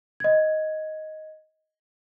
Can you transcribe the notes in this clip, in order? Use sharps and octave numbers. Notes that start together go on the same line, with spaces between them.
D#5 G#6